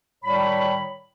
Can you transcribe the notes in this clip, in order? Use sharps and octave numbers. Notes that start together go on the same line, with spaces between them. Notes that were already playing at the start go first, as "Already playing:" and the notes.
A2 D#3 G3 C#5 B5